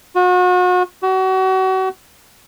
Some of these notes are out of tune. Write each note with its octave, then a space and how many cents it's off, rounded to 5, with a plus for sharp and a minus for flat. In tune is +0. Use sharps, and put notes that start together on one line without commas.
F#4 -35
F#4 +35